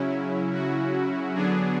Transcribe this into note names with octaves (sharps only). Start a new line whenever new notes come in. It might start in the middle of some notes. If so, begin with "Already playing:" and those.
Already playing: C#3 F#3 C#4 E4
F#4
D3 F#3 B3 D4 G#4